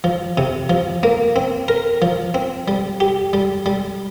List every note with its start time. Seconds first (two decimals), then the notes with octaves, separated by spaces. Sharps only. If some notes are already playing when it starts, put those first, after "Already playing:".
0.04 F3
0.38 C3
0.70 F3
1.03 A#3
1.36 C4
1.68 A#4
2.02 F3
2.34 C4
2.68 G3
3.00 G4
3.33 G3
3.66 G3